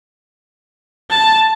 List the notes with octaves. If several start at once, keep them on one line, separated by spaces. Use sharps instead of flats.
A5